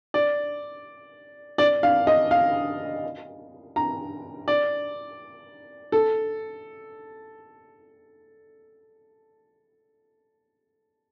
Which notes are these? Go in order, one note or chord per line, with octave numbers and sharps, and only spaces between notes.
D5
D5
F5
D#5
F5
A#5
D5
A4